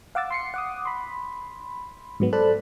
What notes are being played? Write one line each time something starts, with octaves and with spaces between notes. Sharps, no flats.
F5 F#5 D6 E6 A6
C6 C7 C#7
F#5 D6 D#6
B5 C6
G#2 F#3 B3
A4 C5 D5 A5 B5 F#6